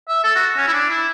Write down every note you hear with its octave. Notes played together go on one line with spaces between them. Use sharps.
E5
A4
F#4
C#4
E4
D4
E4